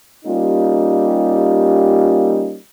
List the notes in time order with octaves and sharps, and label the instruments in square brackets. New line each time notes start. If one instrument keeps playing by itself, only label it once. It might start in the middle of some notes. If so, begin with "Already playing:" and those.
[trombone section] G3 A#3 C#4 D#4 F4 G4